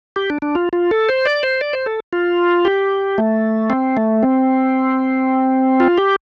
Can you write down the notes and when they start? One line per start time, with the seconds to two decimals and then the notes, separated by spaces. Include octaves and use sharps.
0.16 G4
0.30 D4
0.42 D4
0.55 F4
0.73 F4
0.91 A4
1.09 C5
1.25 D5
1.43 C5
1.61 D5
1.73 C5
1.86 A4
2.13 F4
2.65 G4
3.18 A3
3.70 C4
3.97 A3
4.23 C4
5.80 F4
5.98 G4